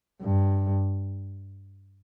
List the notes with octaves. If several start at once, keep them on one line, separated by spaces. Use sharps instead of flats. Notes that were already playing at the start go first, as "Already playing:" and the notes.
G2